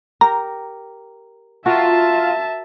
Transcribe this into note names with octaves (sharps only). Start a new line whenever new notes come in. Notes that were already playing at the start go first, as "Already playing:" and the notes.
G4 A#4 A#5
F4 F#4 A#4 E5 A5